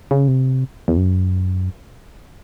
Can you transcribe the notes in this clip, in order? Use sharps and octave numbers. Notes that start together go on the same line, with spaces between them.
C#3
C3
E2
F#2